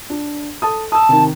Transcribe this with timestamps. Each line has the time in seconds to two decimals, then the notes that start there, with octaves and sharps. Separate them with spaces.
0.10 D4
0.62 A4 A5 D#6
0.92 A5 D#6 E6
1.09 C3 D#3